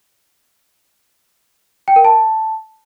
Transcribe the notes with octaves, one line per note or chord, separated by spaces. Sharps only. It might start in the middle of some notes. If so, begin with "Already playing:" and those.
G5
A#4
A5